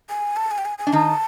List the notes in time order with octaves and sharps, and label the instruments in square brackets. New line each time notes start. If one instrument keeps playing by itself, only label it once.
[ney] G#5
A5
G#5
G5
G#5
G#5
[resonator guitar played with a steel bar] D4
[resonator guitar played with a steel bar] D#3 D#4 [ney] A5